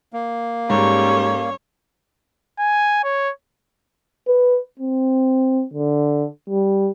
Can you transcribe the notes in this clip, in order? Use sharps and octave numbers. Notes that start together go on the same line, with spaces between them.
A#3
G#2 G3 C#4 A4 C#5
G#5
C#5
B4
C4
D3
G3